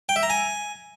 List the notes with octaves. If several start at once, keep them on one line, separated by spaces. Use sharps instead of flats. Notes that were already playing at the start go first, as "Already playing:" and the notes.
G5
E5
A#5
G#5